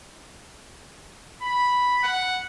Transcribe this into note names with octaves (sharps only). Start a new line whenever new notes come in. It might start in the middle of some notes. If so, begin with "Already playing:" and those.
B5
F#5